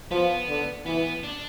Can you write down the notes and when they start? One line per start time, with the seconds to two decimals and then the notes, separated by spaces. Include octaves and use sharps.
0.11 F3 B3
0.48 D3
0.86 E3 B3
1.24 D4